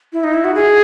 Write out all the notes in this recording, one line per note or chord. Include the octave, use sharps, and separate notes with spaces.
E4
D#4
E4
F#4
G#4